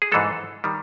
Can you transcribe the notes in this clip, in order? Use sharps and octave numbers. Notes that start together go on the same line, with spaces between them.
G#4
G#2 E3 G#3 A4
D#3 G3